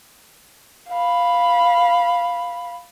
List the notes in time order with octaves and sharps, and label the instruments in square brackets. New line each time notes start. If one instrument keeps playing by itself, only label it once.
[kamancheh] F5 B5